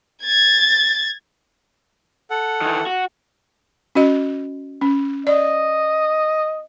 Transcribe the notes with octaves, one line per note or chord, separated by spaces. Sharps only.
G#6 A6
A4 F#5
D#3 E3
F#4
C#4 F#4 D#5
C#4
D5 D#5